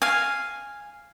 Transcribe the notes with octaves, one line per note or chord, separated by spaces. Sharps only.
F5 G#5